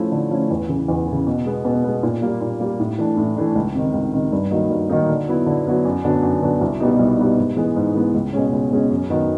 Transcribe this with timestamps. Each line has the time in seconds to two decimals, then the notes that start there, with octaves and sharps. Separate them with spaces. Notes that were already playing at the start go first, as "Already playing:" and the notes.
Already playing: F3 A3 C#4 E4
0.12 D3
0.31 F3 A3 C#4 E4
0.51 E2
0.69 C#3 E3
0.88 E2
1.07 C#3 E3
1.27 B2
1.46 G#3 B3
1.65 B2
1.84 G#3 B3
2.03 A#2
2.22 G3 A#3
2.41 A#2
2.60 G3 A#3
2.80 A2
2.99 E3 A3 D4
3.17 A2
3.37 E3 A3 D4
3.55 C#2
3.75 C3 D#3
3.94 C#2
4.13 C3 D#3
4.32 G2
4.51 D#3 F#3 A#3 D#4
4.70 G2
4.90 D#3 F#3 A#3 D#4
5.09 D3
5.28 F#3 B3 E4
5.46 D3
5.66 F#3 B3 E4
5.85 F#2
6.04 D3 F#3 B3 D4
6.23 F#2
6.42 D3 F#3 B3 D4
6.61 C2
6.80 B2 G3 B3 D#4
6.99 C2
7.18 B2 G3 B3 D#4
7.38 G#2
7.56 E3 G#3 B3
7.76 G#2
7.95 E3 G#3 B3
8.14 C#2
8.33 B2 G#3 C#4
8.53 C#2
8.71 B2 G#3 C#4
8.90 F#2
9.10 D#3 F#3 B3 D#4